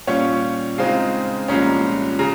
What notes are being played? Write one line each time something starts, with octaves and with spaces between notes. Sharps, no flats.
A#2 G3 C#4 F4 C#5
C#3 G#3 C4 D#4 F5
C2 A#2 F3 G#3 C#4 A#5
C#3 A#5